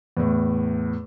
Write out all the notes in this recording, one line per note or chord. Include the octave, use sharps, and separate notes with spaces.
E2 A2